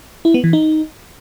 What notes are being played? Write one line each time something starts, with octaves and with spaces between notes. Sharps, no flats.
E4
B3
E3
D#4